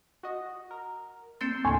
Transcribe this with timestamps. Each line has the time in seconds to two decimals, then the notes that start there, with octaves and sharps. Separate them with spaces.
0.23 F#4 D#5
0.71 A#4
1.41 A#3 C4 C6 E6 G6 A6
1.65 D#2 A2 D3 G#5 C6 C#6